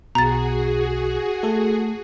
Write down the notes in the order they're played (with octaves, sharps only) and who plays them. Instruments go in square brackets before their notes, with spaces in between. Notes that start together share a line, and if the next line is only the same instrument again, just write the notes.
[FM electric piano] B1 B2 [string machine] F#4 G#4 [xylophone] A#5 A6
[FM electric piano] A3 A4